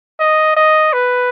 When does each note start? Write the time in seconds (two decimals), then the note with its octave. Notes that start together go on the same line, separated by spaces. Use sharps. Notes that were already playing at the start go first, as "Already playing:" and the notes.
0.20 D#5
0.57 D#5
0.93 B4